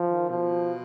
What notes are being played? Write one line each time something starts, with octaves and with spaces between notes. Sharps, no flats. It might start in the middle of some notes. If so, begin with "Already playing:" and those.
Already playing: F3
D#3
B2 F3